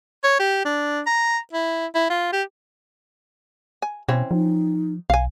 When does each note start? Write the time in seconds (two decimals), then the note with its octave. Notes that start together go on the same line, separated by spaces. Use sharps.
0.24 C#5
0.40 G4
0.65 D4
1.07 A#5
1.53 E4
1.95 E4
2.10 F4
2.33 G4
3.82 G#5
4.09 B2 E3 C4 C#4
4.31 F3 D#4
5.10 B1 F5 G#5